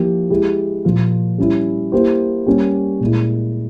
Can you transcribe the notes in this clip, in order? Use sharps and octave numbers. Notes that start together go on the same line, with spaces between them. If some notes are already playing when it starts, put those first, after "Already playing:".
Already playing: F3 A#3 E4 G4
G#3 E4 G4
A#2 F3 A#3 F4
G3 C#4 E4
A#3 E4 G4 C5
G3 A#3 C#4 G4
A#2 G#3 E4